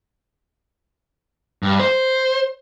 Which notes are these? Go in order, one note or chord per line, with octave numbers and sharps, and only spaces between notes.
G2
C5